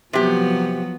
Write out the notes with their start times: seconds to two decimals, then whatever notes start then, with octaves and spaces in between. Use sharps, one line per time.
0.13 C3 F3 F#3 B3 G4